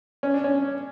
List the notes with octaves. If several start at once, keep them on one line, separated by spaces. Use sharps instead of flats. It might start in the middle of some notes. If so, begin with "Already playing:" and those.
C#4
D4
C#4